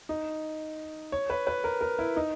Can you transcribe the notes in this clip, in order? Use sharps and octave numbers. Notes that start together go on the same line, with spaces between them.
D#4
C#5
B4
B4
A#4
A#4
E4
D#4